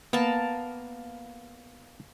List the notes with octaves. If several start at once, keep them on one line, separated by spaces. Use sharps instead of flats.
A#3 B3 A5